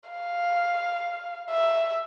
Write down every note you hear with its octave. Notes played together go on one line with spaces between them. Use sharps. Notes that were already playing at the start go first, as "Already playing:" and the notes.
F5
E5